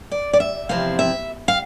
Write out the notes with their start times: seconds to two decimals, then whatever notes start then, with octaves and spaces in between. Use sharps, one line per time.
0.11 D5
0.33 D5
0.40 E5
0.69 E2 C3 F3 C4 E4 F5
0.99 E5
1.48 F5